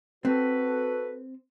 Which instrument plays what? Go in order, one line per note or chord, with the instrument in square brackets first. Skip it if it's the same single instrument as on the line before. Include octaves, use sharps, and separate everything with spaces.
[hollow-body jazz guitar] C4 [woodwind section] F#4 A4 B4